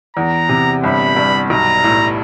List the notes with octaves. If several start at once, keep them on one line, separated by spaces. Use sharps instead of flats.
E2 A#5
C3
G1 B5
G2
B1 A#5
A2